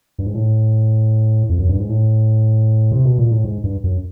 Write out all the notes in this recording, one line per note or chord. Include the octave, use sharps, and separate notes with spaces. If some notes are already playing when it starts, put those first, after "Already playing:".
G2
G#2
A2
F2
F#2
G2
G#2
A2
C3
B2
A#2
A2
G#2
G2
F#2